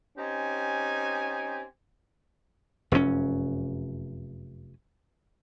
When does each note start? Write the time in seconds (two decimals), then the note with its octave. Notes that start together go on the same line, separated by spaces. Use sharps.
0.17 C4 C#4 D#4 G4 G#5
2.92 F1 F#2 A2 C#4